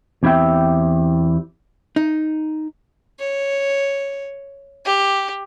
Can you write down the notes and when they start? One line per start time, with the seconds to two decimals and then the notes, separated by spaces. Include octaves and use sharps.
0.23 E2 C4 E4 G4 E5 G5
1.96 D#4
3.19 C#5
4.85 G4